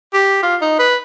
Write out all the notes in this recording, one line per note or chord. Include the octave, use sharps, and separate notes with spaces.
G4
F4
D#4
B4